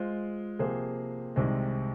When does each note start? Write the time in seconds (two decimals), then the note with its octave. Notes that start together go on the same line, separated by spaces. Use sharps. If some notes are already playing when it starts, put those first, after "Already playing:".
Already playing: G#3 F4 C5
0.59 C3 F3 A#3 G#4 C5
1.36 C2 C3 D#3 G#3 C4